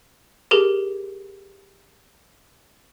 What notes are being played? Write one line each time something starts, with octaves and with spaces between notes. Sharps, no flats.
G4 G#4 A#4